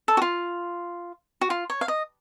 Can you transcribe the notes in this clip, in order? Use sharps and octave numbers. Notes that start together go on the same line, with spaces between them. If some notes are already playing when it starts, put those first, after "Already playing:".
A4
F#4
F4
F#4
F4
C#5
F5
D#5